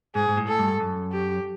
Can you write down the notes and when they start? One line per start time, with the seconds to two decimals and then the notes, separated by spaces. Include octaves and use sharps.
0.15 G#2 G#4
0.28 G#2
0.37 A2
0.48 A4
0.59 G2
0.80 F#2
1.12 G4